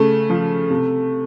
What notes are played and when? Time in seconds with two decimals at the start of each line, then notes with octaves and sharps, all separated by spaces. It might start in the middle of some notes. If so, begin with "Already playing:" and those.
Already playing: C#3 A3
0.30 F3
0.70 C3